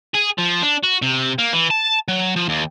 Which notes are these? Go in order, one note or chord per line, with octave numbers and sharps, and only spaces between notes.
G#4
F3
D4
F#4
C3
A#3
E3
A5
F#3
F3
D#2